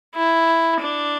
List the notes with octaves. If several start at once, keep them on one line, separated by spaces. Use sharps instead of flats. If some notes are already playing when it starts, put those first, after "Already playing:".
E4
D4